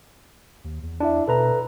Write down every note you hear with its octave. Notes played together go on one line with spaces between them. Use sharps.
D#2
E2
D4 E4 E5
B2 A4 B4 A#5